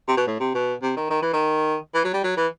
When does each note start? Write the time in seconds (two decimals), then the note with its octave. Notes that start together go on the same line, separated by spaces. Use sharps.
0.08 C3
0.17 B2
0.27 A2
0.40 C3
0.54 B2
0.82 C3
0.96 D#3
1.10 D#3
1.22 E3
1.33 D#3
1.94 E3
2.04 F#3
2.13 G3
2.23 F#3
2.37 E3